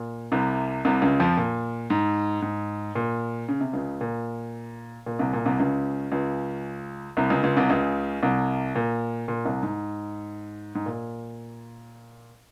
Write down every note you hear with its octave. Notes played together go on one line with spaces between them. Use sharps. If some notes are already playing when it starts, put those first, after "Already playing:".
Already playing: A#2
C2 C3
C2 C3
C#2 C#3
F2 F3
A#2
G#2
G#2
A#2
C#3
C3
C#2 C#3
A#2
A#2
C2 C3
A#2
C2 C3
C#2 C#3
C#2 C#3
C2 C3
C#2 C#3
C#2 C#3
C2 C3
C#2 C#3
C2 C3
A#2
A#2
C2 C3
G#2
G#2
A#2